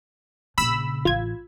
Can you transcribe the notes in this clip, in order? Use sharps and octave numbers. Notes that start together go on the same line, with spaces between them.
A#1 C#3 B5 E6
A1 F4 G#6